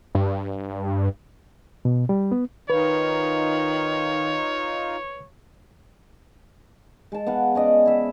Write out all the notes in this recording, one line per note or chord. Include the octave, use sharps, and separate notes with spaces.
G2
B2
G3
B3
D#3 D#4 F4 B4 C#5
G#3 A5
B3 F5 F#5
C#4 D5 D#5
E4 E5